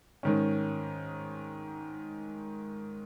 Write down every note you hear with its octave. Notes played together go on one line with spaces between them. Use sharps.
G#2 D#3 C#4